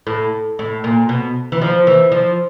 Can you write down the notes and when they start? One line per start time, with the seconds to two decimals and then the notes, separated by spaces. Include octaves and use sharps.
0.07 A2
0.59 A2
0.84 A#2
1.09 B2
1.52 E3
1.61 F3
1.87 E3
2.12 F3